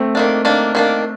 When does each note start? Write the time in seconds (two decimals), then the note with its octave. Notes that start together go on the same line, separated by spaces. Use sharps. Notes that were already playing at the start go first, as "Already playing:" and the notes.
Already playing: A3 C4
0.15 D#3 A#3 D4
0.45 D#3 A#3 D4
0.75 D#3 A#3 D4